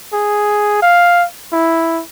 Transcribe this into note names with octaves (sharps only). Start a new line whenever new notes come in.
G#4
F5
E4